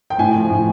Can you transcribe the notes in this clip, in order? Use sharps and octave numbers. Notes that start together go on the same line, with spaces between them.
G5
A2 G#5
F3
A2